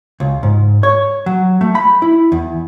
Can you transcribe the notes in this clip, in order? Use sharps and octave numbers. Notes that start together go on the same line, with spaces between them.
C#2
G#2
C#5
F#3
A3
B5
E4
E2